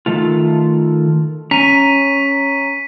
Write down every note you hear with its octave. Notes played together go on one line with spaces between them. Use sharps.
D#3 A3 F4
C#4 A#5 B6 D#7